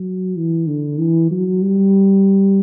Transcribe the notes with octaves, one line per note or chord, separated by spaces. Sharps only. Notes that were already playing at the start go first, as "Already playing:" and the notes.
Already playing: F#3
E3
D3
E3
F#3
G3